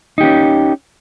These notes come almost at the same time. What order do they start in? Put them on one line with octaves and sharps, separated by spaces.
D#4 G4 C#4